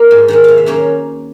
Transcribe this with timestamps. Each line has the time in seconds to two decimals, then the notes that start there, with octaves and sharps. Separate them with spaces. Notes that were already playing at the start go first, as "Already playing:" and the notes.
Already playing: A#3
0.11 G#2
0.28 D#3 G#3 F#5
0.44 C3 F5
0.58 E5
0.66 D#3 F#3 A#3 C#4